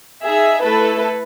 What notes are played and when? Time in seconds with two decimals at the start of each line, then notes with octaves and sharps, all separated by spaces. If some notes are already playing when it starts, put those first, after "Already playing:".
0.23 D#4 G#4 E5
0.62 A3 E4 A4 B4